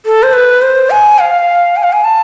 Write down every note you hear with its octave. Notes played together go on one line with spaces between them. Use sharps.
A4
C5
B4
C5
G#5
F5
G#5
F5
G#5
A5